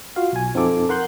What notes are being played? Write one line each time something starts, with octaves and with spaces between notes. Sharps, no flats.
F4 F#4 F5
B1 G#5
F2 C4 D#4 F4 A4 D6
A#4 F#5 C6 F#6 G6